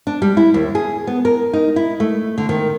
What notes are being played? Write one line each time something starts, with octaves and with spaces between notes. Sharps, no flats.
D4
G3
E4
D#2
G#4
B3
A#4
D#4
E4
A3
D3
D#3